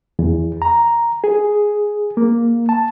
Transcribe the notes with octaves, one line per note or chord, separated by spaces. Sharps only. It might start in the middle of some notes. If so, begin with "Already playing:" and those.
E2
A#5
G#4
A#3
A5